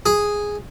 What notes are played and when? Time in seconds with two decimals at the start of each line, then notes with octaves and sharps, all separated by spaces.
0.06 G#4